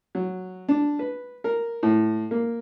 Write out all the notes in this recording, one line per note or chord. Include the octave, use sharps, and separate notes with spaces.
F#3
D4
B4
A#4
A2
A#3